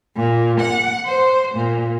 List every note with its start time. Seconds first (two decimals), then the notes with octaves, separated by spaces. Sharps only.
0.16 A#2
0.60 F#5
1.05 C5
1.55 A#2